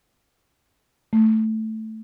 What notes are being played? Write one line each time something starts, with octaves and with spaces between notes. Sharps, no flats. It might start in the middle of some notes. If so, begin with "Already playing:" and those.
A3